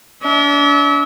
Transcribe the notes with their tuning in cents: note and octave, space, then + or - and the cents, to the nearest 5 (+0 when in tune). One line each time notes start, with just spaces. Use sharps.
D4 -40 E5 -35